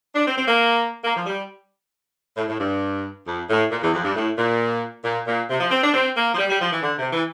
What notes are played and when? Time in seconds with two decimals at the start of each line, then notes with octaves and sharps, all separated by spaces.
0.15 D4
0.26 C4
0.38 C4
0.48 A#3
1.04 A#3
1.16 F3
1.26 G3
2.37 A2
2.49 A2
2.59 G2
3.26 F2
3.49 A2
3.71 A#2
3.83 E2
3.93 F2
4.04 G2
4.15 A2
4.37 A#2
5.04 A#2
5.27 A#2
5.50 C3
5.60 F3
5.71 C4
5.83 D4
5.94 C4
6.16 A#3
6.34 F3
6.38 G3
6.49 G3
6.61 F3
6.72 E3
6.82 D3
6.98 C3
7.12 E3